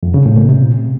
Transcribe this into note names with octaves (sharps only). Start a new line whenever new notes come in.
F2
C#3
A2
A#2
C3